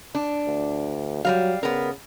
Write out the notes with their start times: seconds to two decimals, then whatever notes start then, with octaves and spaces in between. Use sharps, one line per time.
0.15 D4
0.47 D2
1.25 F#3 G3 A#4 F5
1.63 C#3 B3 A#4